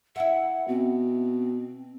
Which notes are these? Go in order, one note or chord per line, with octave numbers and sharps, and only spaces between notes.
E4 E5 F#5
B2 C4